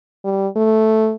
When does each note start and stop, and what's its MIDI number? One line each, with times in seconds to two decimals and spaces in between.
0.25 0.48 55
0.56 1.14 57